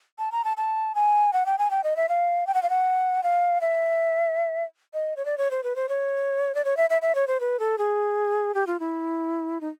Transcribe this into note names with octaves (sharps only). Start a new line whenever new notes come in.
A5
A#5
A5
A5
G#5
F#5
G5
G#5
G5
D#5
E5
F5
G5
F#5
F5
F#5
F5
E5
D#5
C#5
D5
C#5
C5
B4
C5
C#5
D5
C#5
E5
E5
E5
C#5
C5
B4
A4
G#4
G4
F4
E4
D#4